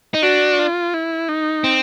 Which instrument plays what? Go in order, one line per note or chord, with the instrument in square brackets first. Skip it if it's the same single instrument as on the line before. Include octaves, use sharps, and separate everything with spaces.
[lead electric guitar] D#4
[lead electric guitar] D4 [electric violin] F#4
[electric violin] F4
E4
D#4
[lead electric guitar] C4